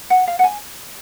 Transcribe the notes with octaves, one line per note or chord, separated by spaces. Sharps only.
F#5
F5
F#5
G#5